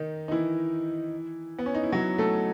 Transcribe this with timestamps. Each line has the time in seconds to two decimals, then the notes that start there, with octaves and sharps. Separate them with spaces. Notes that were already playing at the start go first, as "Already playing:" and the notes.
Already playing: D#3 D#4
0.28 D#4
0.31 E3 E4
1.59 B3
1.66 C#4
1.75 D#4
1.83 E4
1.92 F#3 F#4
2.18 A3 A4